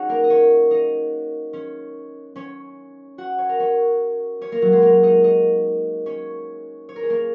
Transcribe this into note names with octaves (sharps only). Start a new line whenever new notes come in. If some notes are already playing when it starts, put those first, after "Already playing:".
Already playing: C#4 D#4 F#4 G#4 C#5 F#5
A#3 A#4
D#5
C#4 C#5
D#4 D#5
C#4 C#5
C#4 C#5
F#4 F#5
C#5
A#4
C#4 C#5
C#4 C#5
A#3 A#4
F#3 F#4
G#3 G#4
A#3 A#4
D#4 D#5
D#4 D#5
C#4 C#5
C#5
A#4
G#4
A#3 A#4